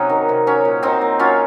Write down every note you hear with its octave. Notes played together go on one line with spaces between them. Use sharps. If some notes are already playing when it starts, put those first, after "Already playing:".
Already playing: C3 F#3 C#4 D#4 F#4
D#3
C3
F#3 C#4
A#2
F#3 C4 D#4
A#2
F#3 C#4 F4